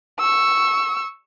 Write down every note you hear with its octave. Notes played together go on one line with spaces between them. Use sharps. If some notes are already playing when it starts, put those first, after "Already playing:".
C#6 E6